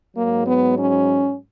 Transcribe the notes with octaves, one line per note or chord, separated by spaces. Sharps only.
G#2 F#3 A#3
B3
C#4